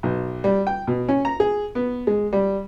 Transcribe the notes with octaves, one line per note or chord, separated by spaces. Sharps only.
B1
G3
G5
B2
C#4
A#5
G#4
B3
G#3
G3